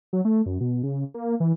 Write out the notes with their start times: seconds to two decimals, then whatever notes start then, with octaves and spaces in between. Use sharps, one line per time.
0.13 F#3
0.25 A3
0.46 F#2
0.61 B2
0.83 C#3
1.14 A#3
1.40 E3